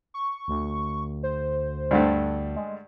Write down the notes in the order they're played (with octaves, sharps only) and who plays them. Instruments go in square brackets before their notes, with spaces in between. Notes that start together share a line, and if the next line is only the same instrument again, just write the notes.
[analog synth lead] C#6
[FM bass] D2
[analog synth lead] C5
[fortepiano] G2 D3 A3
[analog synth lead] G#3